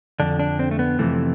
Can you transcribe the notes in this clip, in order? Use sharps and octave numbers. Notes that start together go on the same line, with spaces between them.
F2 D3 D4
D4
C4
A3
B3
F2 C3 E3 A3